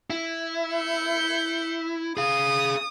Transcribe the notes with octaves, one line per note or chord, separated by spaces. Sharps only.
E4
G6 C#7
G#4 F5 D#6